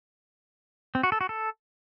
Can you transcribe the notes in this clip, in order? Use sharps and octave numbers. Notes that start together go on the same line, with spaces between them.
C4
F#4
A4
F#4
A4